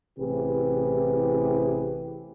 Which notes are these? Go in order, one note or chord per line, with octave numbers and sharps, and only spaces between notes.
A1 C3 E4 G4 G#4 B4